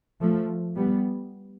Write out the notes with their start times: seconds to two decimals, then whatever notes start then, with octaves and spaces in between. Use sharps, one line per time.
0.21 F3 A3
0.75 G3 B3